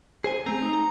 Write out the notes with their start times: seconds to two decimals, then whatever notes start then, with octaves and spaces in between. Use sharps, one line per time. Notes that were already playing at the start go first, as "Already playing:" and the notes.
0.24 G#4 C5 G#5
0.46 A3 C4 A#5
0.62 D#4